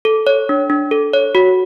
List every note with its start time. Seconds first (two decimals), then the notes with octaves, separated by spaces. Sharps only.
0.05 A4
0.27 C#5
0.49 D4
0.70 D4
0.91 A4
1.14 C#5
1.35 F#4